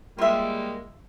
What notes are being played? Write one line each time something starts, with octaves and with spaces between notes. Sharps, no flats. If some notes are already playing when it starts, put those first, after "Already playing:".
G3 G#3 A#3 F4 E5